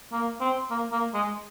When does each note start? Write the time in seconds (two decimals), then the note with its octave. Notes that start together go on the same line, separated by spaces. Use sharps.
0.12 A#3
0.41 C4
0.71 A#3
0.92 A#3
1.14 G#3